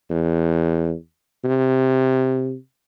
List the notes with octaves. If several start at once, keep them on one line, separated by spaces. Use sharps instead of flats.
E2
C3